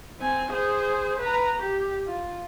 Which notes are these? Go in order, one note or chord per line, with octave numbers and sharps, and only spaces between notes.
C4 G#5
G#4 C5
B4 A#5
G4
F4